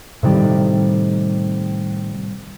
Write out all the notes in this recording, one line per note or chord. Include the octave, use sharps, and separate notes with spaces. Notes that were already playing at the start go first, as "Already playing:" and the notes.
A2 C3 D#3 G3